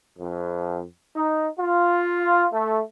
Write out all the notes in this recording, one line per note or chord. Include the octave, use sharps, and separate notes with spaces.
F2
D#4
F4
A3